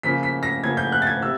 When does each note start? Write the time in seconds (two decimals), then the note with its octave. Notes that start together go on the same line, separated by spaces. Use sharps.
0.03 C#3 F3 A#3 B6
0.23 B6
0.43 A#6
0.63 C#3 F3 A#3 G#6
0.77 G6
0.92 F#6
1.02 A6
1.07 G#6
1.22 C3 E6